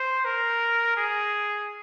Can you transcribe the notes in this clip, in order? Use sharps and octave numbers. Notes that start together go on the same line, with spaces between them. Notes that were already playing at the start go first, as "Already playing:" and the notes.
Already playing: C5
A#4
G#4